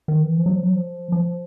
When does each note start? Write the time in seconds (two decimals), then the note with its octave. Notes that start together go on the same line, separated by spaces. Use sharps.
0.08 D#3
0.23 E3
0.38 F3
0.46 F#3
0.52 F3
0.63 F#3
0.72 F3
1.12 F3